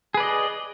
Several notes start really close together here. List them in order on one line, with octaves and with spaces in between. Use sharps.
G#4 B4 D5 D#5